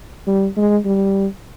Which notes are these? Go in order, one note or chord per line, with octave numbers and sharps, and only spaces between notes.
G3
G#3
G3